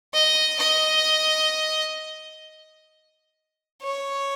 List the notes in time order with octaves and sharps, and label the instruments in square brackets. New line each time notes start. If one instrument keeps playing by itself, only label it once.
[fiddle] D#5
D#5
C#5